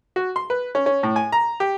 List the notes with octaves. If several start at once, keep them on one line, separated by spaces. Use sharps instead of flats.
F#4
C6
B4
C#4
C#4
A2
G#5
A#5
G4